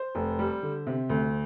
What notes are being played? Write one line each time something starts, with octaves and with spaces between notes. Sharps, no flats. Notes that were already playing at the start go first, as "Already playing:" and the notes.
Already playing: C5
F1
G3
D3
C3
D2